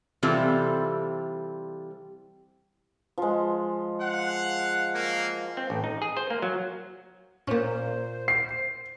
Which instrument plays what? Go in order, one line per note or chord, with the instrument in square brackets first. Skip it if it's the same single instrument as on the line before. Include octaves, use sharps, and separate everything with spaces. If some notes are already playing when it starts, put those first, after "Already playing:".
[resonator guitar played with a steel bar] C3 E3 G3 C4 F4 A4
[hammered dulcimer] F3 G#3
[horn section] F5 F#5
F#3 A#3
[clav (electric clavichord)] C4
A1
D#4
G#4
C5
A#3
F#3
[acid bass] A#2 [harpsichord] A#3 C#4 [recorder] C5
[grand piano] C7